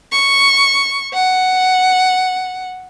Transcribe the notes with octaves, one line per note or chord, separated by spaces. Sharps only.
C#6
F#5